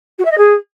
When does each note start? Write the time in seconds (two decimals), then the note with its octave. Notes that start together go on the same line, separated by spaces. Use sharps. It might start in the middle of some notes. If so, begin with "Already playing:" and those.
0.18 F#4
0.25 E5
0.31 D#5
0.37 G#4